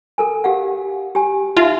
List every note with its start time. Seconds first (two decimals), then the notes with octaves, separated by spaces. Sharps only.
0.18 A4 A#4 G#5
0.44 G4 F5 F#5
1.15 G4 G#5
1.57 D#4 F4 E5 F5